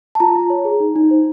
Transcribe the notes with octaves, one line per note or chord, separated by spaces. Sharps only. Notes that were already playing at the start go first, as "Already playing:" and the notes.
A5
F4 A#5
F4
C#5
G#4
D#4
D#4
C5